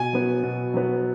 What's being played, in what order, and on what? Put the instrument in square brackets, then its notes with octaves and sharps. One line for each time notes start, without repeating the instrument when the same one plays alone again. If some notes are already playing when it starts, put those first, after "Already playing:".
Already playing: [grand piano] B2 [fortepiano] G#5
[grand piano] F#3 B3
B2
F#3 B3